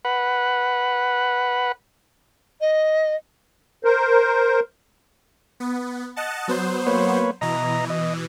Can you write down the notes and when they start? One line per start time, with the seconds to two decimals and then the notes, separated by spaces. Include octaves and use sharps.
0.05 B4 F#5
2.60 D#5
3.84 A#4 C5
5.60 B3
6.16 D#5 F#5 A5
6.48 F#3 B3 C5
6.87 A#3 B4 C#5
7.41 B2 E3 D#5 A#5
7.90 D#5